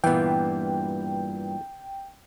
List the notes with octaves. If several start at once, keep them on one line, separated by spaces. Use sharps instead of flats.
G2 A#2 E3 B3 G5